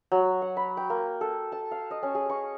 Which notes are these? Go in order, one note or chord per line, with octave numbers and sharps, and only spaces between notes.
F#3
F#5
B5
G5
A#3
A4
A5
F5
D#5
C#4
G#4
C#6